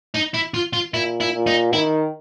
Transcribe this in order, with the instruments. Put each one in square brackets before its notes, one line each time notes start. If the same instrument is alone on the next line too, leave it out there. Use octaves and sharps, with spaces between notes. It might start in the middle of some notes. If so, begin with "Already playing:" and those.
[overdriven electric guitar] D#4
E4
F4
F4
[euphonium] A#2 [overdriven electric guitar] E4
[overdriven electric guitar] E4
[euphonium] A#2
[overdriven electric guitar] D#4
[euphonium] D#3 [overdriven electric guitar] E4